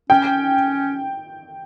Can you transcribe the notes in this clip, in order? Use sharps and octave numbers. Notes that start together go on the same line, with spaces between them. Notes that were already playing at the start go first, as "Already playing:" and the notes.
C#4 G5